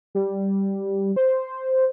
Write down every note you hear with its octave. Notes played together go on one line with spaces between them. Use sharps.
G3
C5